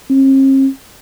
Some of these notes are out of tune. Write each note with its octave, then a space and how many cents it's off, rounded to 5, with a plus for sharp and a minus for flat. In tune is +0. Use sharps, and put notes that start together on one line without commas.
C4 +45